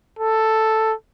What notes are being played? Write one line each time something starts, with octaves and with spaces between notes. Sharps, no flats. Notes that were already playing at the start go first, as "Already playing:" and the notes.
A4